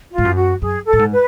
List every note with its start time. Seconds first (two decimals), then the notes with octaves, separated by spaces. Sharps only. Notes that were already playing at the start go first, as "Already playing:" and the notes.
0.13 F4
0.18 G#2
0.25 F#2
0.37 F#4
0.62 F#2 G#4
0.86 A4
0.93 A2
0.99 G#2
1.12 B4